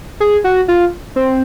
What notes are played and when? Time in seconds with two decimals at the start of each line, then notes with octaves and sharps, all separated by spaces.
0.20 G#4
0.44 F#4
0.68 F4
1.16 C4